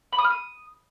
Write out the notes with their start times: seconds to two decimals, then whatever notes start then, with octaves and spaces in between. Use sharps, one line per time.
0.13 B5
0.18 D#6
0.24 F6
0.30 D#6